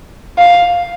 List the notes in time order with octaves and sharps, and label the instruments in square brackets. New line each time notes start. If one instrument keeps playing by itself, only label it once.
[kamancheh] F5